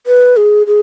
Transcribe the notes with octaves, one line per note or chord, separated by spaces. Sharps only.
B4
G#4
G#4